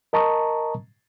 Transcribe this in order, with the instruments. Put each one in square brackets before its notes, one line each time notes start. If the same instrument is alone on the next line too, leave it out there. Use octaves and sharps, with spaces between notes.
[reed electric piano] A#4 D#5 A5 A#5 C#6 D#6